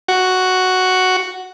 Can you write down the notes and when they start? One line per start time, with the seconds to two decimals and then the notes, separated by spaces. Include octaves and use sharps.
0.08 F#4